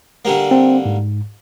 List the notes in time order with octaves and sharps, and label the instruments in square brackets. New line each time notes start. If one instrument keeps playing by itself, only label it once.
[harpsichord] D3 G3 A#3
[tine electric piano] C4
G#2